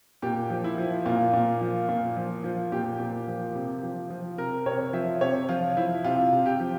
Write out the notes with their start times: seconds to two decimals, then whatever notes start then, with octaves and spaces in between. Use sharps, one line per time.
0.22 A#2 G4
0.50 F3
0.64 E4
0.78 F3
1.06 A#2 F4
1.33 A#2
1.61 F3
1.89 A#2
2.16 F3
2.44 F3
2.72 A#2 G4
3.00 A#2
3.27 F3
3.55 C3
3.83 F3
4.10 F3
4.38 C3 A#4
4.66 C3 C#5
4.93 F3 E5
5.21 C3 C#5
5.49 F3 F4
5.77 F3 E4
6.04 C3 F4
6.32 C3
6.46 G4
6.60 F3